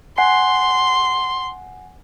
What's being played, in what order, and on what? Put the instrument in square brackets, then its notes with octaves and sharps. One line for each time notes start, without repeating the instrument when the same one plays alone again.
[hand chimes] F#5 G#5 C7 [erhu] C6